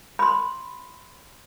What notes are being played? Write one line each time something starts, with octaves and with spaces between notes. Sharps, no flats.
B5 C6